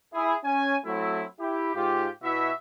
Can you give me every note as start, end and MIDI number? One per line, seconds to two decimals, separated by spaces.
0.14 0.35 64
0.14 0.35 68
0.45 0.76 61
0.45 0.76 80
0.85 1.24 54
0.85 1.24 57
0.85 1.24 60
0.85 1.24 64
1.40 1.74 64
1.40 1.74 67
1.75 2.08 44
1.75 2.08 65
1.75 2.08 67
2.23 2.50 47
2.23 2.50 64
2.23 2.50 66
2.23 2.50 76